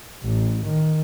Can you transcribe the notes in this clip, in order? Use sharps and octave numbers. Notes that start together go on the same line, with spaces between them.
A1
D#3